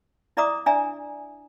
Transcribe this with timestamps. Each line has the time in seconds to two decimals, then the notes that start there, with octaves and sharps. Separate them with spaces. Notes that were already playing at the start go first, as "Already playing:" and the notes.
0.37 E4 D5 E5 A#5 D6 D#6
0.66 D4 D5 E5 G#5 A#5